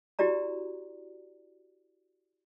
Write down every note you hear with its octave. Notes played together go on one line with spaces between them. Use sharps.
E4 F#4 G4 D5 A#5